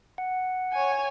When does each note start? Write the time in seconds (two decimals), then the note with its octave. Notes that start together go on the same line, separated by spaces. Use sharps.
0.18 F#5
0.73 C#5 G#5